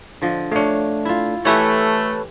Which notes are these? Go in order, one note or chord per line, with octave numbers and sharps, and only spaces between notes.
D3 F3 D#5
A3 D4 C#5 F5
E4 F4
E3 A3 G4 A4 B4 C#5